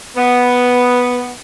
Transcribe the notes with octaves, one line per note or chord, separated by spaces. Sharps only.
B3